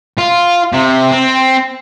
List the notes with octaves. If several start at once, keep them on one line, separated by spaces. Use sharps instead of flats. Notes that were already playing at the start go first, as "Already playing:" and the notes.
F4
C3
C4